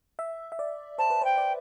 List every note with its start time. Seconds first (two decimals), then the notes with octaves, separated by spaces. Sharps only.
0.19 E5
0.52 E5
0.59 D5
0.98 C5 A5
1.10 B4
1.22 C5 G5
1.37 D5